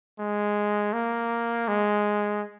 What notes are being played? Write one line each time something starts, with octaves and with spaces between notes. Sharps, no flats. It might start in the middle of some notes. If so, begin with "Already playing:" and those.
G#3
A#3
G#3